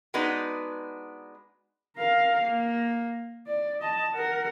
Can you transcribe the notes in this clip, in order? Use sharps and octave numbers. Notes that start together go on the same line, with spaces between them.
G#3 B3 D4 D#4 F#4 B4
A#4 F5
A#3
D5
D#5 A5
A#4 F#5